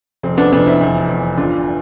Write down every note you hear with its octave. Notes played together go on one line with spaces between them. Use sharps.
F1 C4
B3 D4
F1 B3 D4
C4 E4
E2
E2
G1 D4 F4